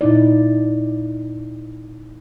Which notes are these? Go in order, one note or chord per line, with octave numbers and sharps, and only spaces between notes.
A#2 D#4 E4 D5